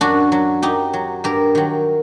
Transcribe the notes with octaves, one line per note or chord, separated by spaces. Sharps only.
F#2 D4 F#4
F#3
F#2 D#4 G4
F#3
G2 G4 A#4
D#3 F#3